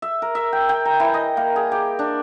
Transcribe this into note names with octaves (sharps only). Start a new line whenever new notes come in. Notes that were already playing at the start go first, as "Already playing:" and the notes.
E5
A#4
E5
G5
G5
A#5
E3
D#5
A#3
G#4
G4
D4